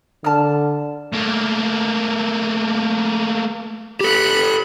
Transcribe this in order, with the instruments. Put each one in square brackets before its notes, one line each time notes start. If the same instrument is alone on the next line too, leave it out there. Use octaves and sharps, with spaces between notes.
[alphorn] D3 [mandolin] A5 F6
[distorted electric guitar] A3 A#3
[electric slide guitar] G4 A4 [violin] B5 F#6